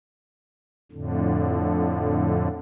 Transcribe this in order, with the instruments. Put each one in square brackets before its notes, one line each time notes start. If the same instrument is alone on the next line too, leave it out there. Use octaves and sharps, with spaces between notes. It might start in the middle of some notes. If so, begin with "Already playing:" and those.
[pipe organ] F2 A2 D3